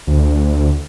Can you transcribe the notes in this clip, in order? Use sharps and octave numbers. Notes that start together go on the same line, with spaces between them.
D2